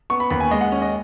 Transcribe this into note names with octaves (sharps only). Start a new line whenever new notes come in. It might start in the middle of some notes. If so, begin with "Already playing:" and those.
B3 C#6
B5
D#2 B5
G#5
G#3 D#5
F#5
C#4
D#5